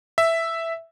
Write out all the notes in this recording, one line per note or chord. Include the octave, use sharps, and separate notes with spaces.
E5